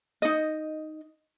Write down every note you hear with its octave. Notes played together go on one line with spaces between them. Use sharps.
D#4 D#5